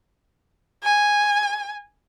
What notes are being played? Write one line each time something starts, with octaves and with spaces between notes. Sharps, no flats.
G#5